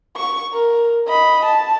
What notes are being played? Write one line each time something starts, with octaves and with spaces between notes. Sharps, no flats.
C#6
A#4
D#5 B5
A5